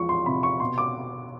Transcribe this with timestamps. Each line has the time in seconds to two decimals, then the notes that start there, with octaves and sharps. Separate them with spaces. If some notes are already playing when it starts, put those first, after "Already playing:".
Already playing: E2 F3 G#3 C#6
0.09 C6
0.26 C3 B5
0.43 C#6
0.60 B2 C6
0.78 D6